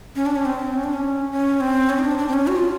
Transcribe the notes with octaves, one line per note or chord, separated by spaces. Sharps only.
C#4
D4
C#4
C4
C#4
D4
C#4
C#4
C4
C#4
D#4
D4
D4
C4
C#4
F#4
F4